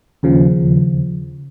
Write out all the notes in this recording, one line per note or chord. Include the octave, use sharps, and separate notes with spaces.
D#2 C#3 F3